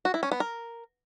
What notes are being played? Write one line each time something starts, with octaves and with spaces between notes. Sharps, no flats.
F#4
E4
C#4
B3
A#4